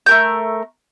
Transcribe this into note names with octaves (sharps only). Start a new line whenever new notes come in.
A3 A#4 G6